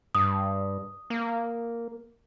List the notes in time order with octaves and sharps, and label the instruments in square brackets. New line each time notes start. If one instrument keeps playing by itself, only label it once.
[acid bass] G2 [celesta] D#6
[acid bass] A#3